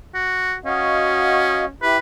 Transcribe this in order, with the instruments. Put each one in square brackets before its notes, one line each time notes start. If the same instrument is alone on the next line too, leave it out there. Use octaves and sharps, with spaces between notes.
[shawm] F#4
[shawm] C#4 [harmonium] F#4 D#5 F5
[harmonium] E4 G4 [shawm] B4